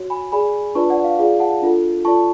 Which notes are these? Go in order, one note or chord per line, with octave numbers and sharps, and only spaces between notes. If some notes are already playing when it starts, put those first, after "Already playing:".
Already playing: F#4 C#5
G#5 B5
G#4 D5 G#5 B5
D4 F4 B4 D5 A5 C#6
D5 F#5
F5
F4 G#4 D5 F5
F#5 A5
D4 F4 A4
F4 A4 D5 A5 C#6